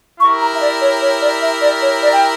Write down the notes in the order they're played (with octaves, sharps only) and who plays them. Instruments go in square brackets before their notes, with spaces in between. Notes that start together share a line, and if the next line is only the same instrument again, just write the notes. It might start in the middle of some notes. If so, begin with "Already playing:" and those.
[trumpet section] E4 G4 A#4 [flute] C#6
[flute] A#5
E5
D5
C#5
C#5
D5
E5
D5
C#5
D5
G5